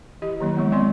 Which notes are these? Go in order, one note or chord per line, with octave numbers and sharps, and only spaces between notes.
E3 E4 G4 D#5
D#3 F#3 A#3 E4
F3 G#3 B3
G#3 B3 C4 D5 D#5 C6